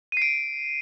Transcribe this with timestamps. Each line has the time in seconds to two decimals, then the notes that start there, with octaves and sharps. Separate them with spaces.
0.12 D#7
0.17 C7
0.22 D7